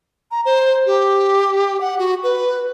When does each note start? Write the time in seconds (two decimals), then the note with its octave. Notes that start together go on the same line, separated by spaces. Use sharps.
0.31 A#5
0.45 C5
0.86 G4
1.81 F#5
1.99 F#4
2.23 B4